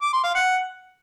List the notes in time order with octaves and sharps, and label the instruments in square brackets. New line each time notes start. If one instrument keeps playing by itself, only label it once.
[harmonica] D6
C6
F5
F#5